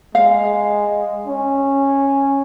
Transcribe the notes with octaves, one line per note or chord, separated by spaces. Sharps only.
G#3 F5
C#4